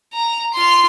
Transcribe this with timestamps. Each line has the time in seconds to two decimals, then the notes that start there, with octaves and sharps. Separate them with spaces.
0.13 A#5
0.53 F4 C6